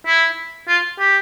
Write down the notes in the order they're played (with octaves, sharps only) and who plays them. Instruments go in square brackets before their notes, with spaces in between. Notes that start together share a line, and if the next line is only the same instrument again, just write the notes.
[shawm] E4
F4
G4